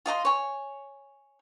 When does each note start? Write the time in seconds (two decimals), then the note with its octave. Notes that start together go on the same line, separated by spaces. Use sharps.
0.06 F4 D#5 A5 C6
0.25 C#5 G#5